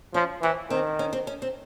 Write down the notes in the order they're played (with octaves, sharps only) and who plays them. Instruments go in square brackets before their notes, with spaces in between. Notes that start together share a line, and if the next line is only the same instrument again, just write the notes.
[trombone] F3 [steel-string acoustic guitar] C#4
[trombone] E3 [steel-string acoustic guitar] C4
[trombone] D#3 [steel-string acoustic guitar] C4
[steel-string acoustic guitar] C#4
C4
C#4
C4